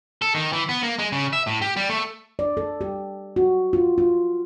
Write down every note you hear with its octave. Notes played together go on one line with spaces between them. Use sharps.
A4
D#3
E3
B3
A#3
G#3
C#3
E5
A2
G4
G3
A3
D5
A4
G4
F#4
F4
F4